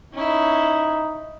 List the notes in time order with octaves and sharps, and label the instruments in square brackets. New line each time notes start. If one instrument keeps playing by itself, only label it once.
[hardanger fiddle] C#4 E4 [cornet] D#4